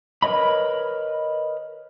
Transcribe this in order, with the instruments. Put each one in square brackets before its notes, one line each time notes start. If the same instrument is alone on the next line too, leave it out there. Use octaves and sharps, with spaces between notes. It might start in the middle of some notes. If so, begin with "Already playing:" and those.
[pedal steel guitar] A#4 B4 C#5 D#5 B5